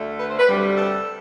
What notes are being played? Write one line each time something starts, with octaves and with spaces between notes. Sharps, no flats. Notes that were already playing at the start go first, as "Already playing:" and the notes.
Already playing: D2 D3 A3
B4
C5
B4
D2 C3 G3
A4